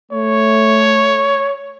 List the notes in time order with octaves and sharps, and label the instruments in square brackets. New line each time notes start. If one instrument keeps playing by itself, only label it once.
[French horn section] A3 [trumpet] C#5